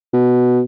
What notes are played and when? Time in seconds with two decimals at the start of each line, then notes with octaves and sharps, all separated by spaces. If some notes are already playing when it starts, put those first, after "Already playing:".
0.14 B2